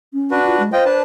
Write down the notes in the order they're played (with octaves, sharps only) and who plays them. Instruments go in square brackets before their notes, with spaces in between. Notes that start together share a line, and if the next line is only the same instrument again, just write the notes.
[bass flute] C#4
[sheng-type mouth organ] D4 F#4 B4
[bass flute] F4
G#3
[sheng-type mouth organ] F4 D#5 G5 [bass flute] C5
[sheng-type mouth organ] D4 B4 A5